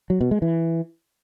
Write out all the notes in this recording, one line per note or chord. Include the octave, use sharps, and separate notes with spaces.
F#3
B2
G#3
E3